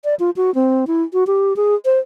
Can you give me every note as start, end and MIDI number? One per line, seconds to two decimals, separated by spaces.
0.04 0.15 74
0.20 0.30 65
0.36 0.53 66
0.55 0.85 60
0.87 1.03 64
1.13 1.27 66
1.27 1.56 67
1.56 1.75 68
1.85 1.99 72